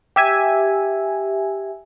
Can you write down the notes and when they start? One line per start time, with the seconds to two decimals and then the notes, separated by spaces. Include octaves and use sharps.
0.16 G4 E5 G#5